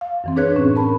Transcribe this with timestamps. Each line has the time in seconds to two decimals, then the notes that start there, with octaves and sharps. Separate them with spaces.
0.01 F5
0.24 F#2 E3 C4
0.36 D4 G#4 B4 C#5 F#6 G#6
0.55 A2 C4 C#4
0.75 C4 A#4 A5 B5